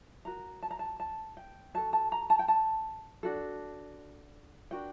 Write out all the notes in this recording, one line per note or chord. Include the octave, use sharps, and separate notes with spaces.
F#4 A#4 A#5
A5
A#5
A5
A5
G5
F#4 A4 A5
A5
A#5
A5
G5
A5
D4 F#4 A4
D4 F#4 A#4 G5